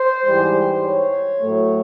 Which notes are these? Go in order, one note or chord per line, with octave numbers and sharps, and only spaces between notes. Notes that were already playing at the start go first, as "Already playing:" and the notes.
Already playing: C5
G#2 E3 G3
C#5
A2 F#3 A3